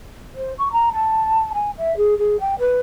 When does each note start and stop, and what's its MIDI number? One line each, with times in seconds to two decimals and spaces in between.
0.35 0.52 72
0.58 0.71 85
0.72 0.89 82
0.92 1.50 81
1.53 1.70 80
1.77 1.96 76
1.96 2.17 68
2.18 2.39 68
2.39 2.57 79
2.58 2.79 71